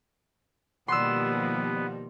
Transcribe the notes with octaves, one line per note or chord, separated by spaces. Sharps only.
B2 D#3 F3 G3 A#3 B3 C6 E6